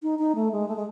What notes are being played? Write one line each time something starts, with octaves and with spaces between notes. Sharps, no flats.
D#4
D#4
A3
G#3
A3
G#3